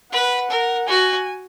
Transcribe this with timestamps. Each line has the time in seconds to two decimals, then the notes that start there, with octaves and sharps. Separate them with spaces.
0.12 B4 F#5
0.50 A#4
0.87 F#4 G#5